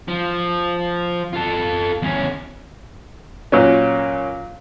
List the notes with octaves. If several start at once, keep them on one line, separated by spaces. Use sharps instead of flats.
F3
F4 A4
E2 C#4
A#2 F#3 C#4